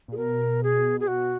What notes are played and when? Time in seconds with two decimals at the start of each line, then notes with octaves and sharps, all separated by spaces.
0.08 A#2 G#4
0.17 B2 A#4
0.63 G#4
1.00 G#4
1.07 F#4